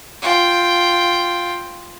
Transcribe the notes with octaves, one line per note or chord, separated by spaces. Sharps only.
F4 G5